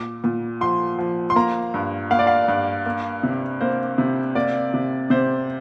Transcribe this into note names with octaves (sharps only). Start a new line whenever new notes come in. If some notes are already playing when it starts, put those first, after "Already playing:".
Already playing: A#2 D6
A#2
F3 C6
F3
C6
A#3 A#5
G2
A#3 F5
D5
F5
G2
A#3
C3
A#3 C5
C3
A#3 D5
C3
C3 C5